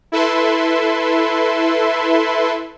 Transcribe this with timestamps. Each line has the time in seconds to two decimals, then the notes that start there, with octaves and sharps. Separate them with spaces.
0.12 E4 A4 B4 E5 C6